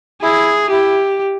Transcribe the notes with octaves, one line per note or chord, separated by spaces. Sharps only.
E4 G#4
E4 G4